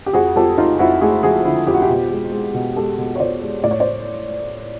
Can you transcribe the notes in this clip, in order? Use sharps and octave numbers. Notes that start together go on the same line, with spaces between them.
G4
F2 F#4 G#4
F2 G4 A4
F2 D#4 F4
F2 E4 F#4
A3 F#4 G#4
F3 F#4 G#4
D3 E4 F#4
F2 G4
F#4
F4 G4
B2
G#3
G#3
B2
G#3 G4 A4
B2
C#5
B2 C5 D5
G#3
A2 D5
C#5
C5 D5